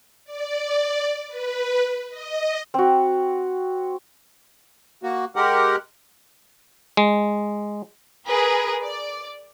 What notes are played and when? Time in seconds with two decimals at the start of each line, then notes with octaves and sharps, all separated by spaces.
0.25 D5
1.28 B4
2.09 D#5
2.74 C4 F#4
5.03 A#3 F#4
5.36 G#3 G4 A#4 F#5
6.97 G#3
8.28 G#4 A#4 B4
8.82 D5